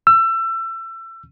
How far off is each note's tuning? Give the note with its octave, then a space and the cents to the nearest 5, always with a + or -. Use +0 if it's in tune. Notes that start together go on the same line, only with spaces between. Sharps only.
E6 +30